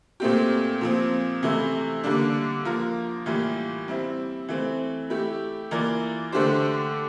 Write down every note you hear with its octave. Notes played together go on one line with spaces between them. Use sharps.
A#2 A3 C4 G4
A#2 F3 C4
C3 E3 A3 E4
D3 G3 A#3 D4
F3 A#3 F4 A#4
A2 E3 G3 A#3 F4
G3 C4 E4
E3 A3 C4
A3 E4 G4
E3 A#3 F4 A#4 D5
D3 A3 D4 G4 C5